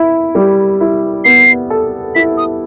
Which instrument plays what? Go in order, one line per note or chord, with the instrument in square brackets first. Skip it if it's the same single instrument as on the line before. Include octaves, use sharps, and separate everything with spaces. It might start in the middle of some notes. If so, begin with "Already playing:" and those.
Already playing: [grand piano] E4
G3
E4
[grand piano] B3 [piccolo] C7
[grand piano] A4
[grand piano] E4 [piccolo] B6
[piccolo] D#6